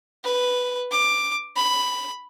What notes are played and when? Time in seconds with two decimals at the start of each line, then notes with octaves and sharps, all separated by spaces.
0.24 B4
0.91 D6
1.56 B5